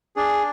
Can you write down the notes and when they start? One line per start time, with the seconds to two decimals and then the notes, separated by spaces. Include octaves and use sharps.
0.16 D4 G#4